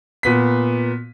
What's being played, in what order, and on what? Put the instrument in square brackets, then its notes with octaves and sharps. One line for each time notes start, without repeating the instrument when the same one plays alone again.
[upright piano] A#2 B3 B6